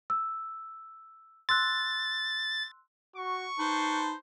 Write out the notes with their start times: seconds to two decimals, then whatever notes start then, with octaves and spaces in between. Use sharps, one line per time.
0.10 E6
1.49 C6 E6 F#6 A6
3.16 F#4 C#6
3.59 D#4 B4 C5 A5